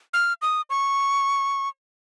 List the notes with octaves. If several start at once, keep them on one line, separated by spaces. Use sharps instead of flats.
F6
D#6
C#6